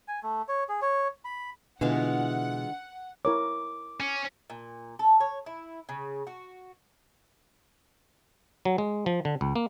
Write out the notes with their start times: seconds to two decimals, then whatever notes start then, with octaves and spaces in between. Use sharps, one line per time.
0.08 G#5
0.23 A3
0.49 C#5
0.69 G#4
0.82 C#5
1.25 B5
1.81 B2 D3 E3 G#3 F4 F#5
3.25 E4 A#4 C#5 D6
4.00 C#4
4.50 A#2
4.99 A4
5.20 C#5
5.46 E4
5.89 C#3
6.27 F#4
8.65 F#3
8.78 G#3
9.06 F3
9.25 D3
9.41 C#2
9.56 A#3